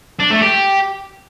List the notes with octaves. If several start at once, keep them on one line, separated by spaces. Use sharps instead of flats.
D4
A3
G4